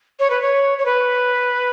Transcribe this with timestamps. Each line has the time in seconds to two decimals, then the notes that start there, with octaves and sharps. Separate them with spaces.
0.20 C#5
0.30 B4
0.42 C#5
0.78 C#5
0.86 B4